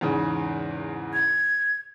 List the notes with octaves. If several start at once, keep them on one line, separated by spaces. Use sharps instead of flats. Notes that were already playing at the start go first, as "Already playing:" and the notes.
E2 G#2 C#3
G#6